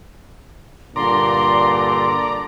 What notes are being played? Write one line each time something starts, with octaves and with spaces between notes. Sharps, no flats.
G2 A#2 D3 D5 A#5 C6